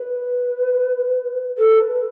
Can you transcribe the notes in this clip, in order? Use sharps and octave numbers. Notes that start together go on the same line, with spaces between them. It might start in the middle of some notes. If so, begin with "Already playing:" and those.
Already playing: B4
A4
B4